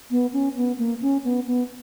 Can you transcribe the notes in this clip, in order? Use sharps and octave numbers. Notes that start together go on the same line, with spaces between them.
B3
C#4
B3
A#3
C#4
B3
B3